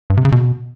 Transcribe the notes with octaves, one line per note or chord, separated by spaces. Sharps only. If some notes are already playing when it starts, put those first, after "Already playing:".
G2
C3
C#3
B2